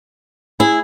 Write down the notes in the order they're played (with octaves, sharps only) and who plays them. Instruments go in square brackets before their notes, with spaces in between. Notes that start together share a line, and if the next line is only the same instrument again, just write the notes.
[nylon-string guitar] E4 [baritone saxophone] G#4